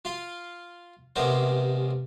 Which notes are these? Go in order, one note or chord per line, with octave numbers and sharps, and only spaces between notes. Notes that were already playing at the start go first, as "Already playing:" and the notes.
F4 F5 C6
A1 C3 G#3 B3 A#4 C5